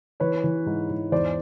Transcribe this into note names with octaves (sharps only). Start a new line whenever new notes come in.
E3 B4 C#5
E3
G#2
G#2
E2 C5 D5